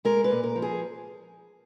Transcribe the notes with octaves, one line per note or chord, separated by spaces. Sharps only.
G#3 A#4
B4
A#2
A#4
F3
G#4